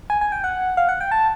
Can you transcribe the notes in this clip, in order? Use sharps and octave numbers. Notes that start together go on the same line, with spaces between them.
G#5
G#5
G5
F#5
F5
F#5
G5
A5